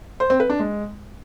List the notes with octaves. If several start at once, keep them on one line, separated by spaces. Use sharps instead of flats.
C5
C4
B4
D4
G#3